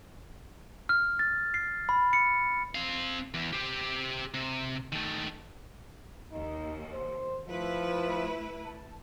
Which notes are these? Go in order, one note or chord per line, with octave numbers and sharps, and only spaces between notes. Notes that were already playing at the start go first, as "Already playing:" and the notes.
F6
A6
C7
B5
C#7
C4 F5
E2
G4 C5
C3
D#3 A3
D#2 D#4
C5
F3 A3 E4 B4
A5